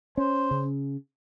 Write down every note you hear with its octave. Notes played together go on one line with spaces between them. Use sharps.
C#4 C5
C#3